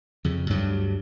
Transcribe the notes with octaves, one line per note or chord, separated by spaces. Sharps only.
F2 C#3
D2 G2 F#3